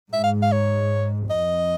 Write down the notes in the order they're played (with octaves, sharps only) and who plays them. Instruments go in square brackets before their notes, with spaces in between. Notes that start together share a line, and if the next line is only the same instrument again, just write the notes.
[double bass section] G#2 [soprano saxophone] E5
[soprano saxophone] F5
F5
C#5
[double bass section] F2 [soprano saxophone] D#5